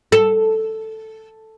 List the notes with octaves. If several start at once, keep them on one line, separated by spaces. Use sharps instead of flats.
A4